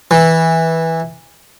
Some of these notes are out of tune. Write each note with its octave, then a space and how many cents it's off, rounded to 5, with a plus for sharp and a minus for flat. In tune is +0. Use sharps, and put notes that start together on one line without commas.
E3 -10